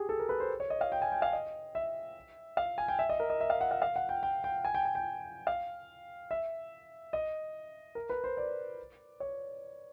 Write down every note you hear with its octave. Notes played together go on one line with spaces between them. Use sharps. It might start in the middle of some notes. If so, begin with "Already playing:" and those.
Already playing: G4 G#4
A4
A#4
B4
C5
C#5
D#5
F5
G5
G#5
G5
F5
D#5
E5
F5
G#5
G5
E5
D#5
A#4
D#5
E5
F5
F#5
F5
F5
F#5
G5
G5
G5
G#5
G5
G#5
G5
F5
E5
D#5
A#4
B4
C5
D5
C#5